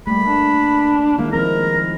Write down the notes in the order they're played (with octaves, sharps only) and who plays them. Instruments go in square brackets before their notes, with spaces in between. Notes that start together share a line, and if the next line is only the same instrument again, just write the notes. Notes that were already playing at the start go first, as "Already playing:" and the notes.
[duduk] G3 [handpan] A3 A#3 [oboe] B5
[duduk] D4
[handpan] D#3 G#3 E4 [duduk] A#3
[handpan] F3 C4 [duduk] A#4 [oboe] A#5